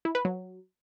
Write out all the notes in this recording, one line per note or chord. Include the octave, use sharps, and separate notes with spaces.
E4
B4
F#3